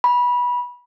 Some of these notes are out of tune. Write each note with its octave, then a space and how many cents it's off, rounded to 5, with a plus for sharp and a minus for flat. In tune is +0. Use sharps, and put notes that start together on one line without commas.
B5 -20